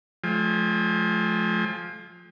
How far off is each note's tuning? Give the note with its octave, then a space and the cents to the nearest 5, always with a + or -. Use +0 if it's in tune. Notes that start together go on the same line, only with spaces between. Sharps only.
F3 +10 A3 -45 G#5 -40